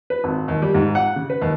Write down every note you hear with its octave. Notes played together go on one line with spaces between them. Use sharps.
B4
G#1
D#2
G3
G#2
F#5
C#3
B4
D#2